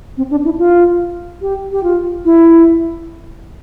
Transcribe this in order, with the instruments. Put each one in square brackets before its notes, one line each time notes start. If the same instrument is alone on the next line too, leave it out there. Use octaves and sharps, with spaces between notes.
[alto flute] C4
D4
E4
F4
G4
G4
F4
E4